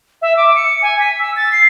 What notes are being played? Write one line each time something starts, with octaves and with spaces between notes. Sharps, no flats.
E5
D6
C#7
G#5
B6
E6
A6
C7